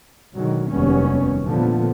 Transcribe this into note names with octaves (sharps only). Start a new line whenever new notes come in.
B2 D3 D#3 F#3 G#3
F1 D#2 F#3 G3 B3 C#4
A#2 D3 F3 A3 B3